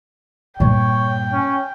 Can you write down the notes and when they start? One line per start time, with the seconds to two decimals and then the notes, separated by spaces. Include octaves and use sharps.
0.60 G2 A#2 C#5 G5
1.32 C#4